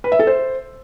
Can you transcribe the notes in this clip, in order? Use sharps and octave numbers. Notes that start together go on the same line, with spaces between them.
B4
E5
A4
C5